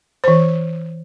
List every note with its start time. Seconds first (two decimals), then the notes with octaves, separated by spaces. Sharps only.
0.24 E3 C5